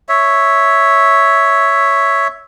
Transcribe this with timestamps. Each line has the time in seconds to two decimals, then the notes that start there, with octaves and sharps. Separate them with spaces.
0.09 C#5 E5